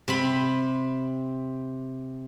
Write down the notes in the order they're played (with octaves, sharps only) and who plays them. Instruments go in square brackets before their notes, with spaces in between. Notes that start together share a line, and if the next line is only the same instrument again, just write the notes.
[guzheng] C3 C4 B5